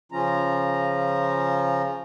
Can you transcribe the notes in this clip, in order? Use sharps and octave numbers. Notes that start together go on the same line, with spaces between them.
C#3 F3 C#4 F4 A#5